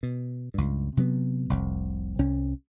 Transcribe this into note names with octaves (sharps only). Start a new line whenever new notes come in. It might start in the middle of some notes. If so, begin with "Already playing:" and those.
B2
C#2 G2
C3 F#3 A#3 B3
F1 C2
C2 C#4